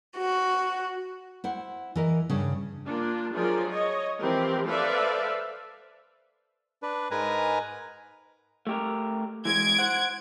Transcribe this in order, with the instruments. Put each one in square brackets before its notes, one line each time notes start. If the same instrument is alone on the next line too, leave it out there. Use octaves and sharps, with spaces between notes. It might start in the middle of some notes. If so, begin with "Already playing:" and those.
[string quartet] F#4
[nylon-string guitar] E4 C5 F#5
E3 A#4 D#5
G2 C#3
[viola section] A#3 D4 F4
F3 F#3 F4 G#4 A#4 D5
C#5 D#5
E3 F3 C4 G4 A#4
A4 B4 C5 D5 E5 F5
[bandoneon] D4 B4
G#2 G#3 A#4 B4 G#5 A#5
[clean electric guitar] A3 G4 A#4
[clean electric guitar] E3 G#3 [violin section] G#6 D7
[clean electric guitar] C5 F#5